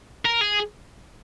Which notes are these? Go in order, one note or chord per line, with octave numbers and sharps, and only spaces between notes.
A#4
G#4